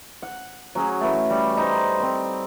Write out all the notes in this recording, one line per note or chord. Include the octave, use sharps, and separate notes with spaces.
F#5
F#3 C#4 G#4
E3 A3
G3
D#4 C5
C4 B5